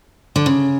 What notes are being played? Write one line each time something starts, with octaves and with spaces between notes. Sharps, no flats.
D3
C#3